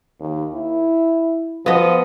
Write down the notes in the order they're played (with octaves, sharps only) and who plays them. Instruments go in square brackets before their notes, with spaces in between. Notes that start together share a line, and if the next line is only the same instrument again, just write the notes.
[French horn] D#2
E4
[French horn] F3 [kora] B3 D#5